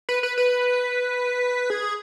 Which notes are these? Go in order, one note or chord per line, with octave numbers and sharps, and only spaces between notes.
B4
B4
B4
G#4